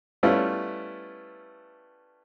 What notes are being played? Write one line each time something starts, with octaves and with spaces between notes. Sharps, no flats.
G3 A3 B3 C#4 E4 F4